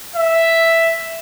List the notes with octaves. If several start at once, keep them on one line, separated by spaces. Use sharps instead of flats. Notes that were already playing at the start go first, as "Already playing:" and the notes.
E5